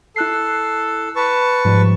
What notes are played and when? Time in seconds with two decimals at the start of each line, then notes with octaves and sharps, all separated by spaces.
0.16 E4 A4 F#6 C7
1.16 B4 A5 C#6
1.65 G#2 F3 G3